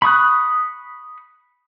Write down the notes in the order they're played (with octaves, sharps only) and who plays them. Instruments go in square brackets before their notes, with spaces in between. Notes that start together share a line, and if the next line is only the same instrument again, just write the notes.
[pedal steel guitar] B5 C#6 D#6 F#6